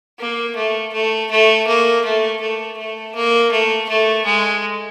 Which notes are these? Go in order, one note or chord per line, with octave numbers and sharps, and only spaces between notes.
A#3
A3
A3
A3
A#3
A3
A3
A3
A#3
A3
A3
G#3